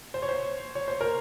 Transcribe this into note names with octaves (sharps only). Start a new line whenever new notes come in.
C5
C#5
C5
C#5
C5
A#4